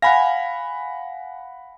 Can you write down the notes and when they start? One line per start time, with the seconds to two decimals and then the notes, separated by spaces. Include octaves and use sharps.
0.02 F5 F#5 G#5 B5 A#6